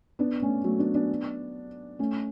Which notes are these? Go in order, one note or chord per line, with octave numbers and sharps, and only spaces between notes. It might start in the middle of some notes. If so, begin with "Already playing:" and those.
B3 D4
A3 C#4
F#3 A3
B3 D4
B3 D4
A3 C#4